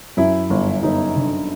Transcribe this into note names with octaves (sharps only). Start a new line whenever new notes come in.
F#2 E4
G1
G1 D#4
D3